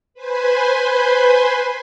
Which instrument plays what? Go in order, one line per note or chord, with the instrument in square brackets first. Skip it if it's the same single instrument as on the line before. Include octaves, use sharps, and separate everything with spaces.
[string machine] B4 C5 G#5 B5 C6